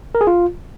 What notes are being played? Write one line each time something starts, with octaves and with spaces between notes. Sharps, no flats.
A#4
G#4
F4